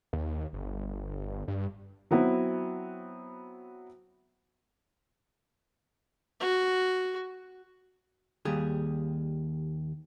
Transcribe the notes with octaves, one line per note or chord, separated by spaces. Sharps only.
D#2
G1
G2
F#3 B3 C4 E4
F#4
D#2 G3 G#4